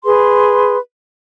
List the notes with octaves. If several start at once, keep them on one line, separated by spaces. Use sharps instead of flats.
G#4 B4 C6